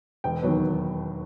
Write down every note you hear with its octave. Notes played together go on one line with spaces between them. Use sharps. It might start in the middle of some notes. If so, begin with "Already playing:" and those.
E1 G5
D#2 D#3 F#3 B3